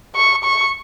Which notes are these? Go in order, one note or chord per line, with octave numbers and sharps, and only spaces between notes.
C#6
C#6